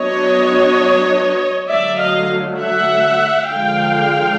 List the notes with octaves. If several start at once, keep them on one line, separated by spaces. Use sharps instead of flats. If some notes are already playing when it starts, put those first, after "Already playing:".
Already playing: F#3 B3 D4 C#5 D#5
D3 F#3 A3 D5 E5
D#5 F5
E5 F#5
D3 F3 G#3 F5 G5